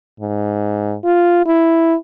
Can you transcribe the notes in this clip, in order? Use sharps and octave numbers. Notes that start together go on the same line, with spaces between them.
G#2
F4
E4